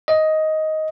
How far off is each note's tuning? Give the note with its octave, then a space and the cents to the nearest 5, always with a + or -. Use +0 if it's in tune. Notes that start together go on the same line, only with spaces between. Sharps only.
D#5 +10